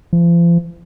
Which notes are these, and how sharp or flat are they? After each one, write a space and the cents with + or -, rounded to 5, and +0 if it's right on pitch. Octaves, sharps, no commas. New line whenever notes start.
F3 -40